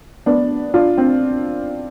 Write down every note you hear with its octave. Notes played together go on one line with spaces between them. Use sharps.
B3 D4
D4 F4
C4